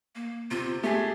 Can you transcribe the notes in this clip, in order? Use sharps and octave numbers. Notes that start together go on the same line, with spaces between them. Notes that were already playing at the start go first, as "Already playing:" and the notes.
A#3
C3 F4
A3 G4 G#4